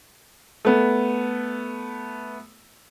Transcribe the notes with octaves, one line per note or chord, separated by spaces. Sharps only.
A3 B3